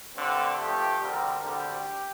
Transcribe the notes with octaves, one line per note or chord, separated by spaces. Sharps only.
G2 D3 A3 C4
G2 F3 A3 G4
D2 D3 G3 C4 A#4
D2 D3 G3 C4 G4